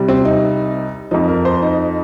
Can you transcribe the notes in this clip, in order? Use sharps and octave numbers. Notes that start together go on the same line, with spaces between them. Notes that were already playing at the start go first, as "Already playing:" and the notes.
Already playing: C2 C3 G3
C4
D#4
F2 F3 D#4
A#4
C5
D#4